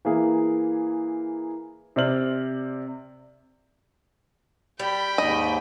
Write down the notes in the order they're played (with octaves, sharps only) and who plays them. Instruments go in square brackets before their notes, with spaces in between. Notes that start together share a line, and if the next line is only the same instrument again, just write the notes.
[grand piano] E3 A#3 G#4
C3 C5 D5 F6 F#7
[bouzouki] G3 [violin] G5 B5
[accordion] D#2 G#2 [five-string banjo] D#5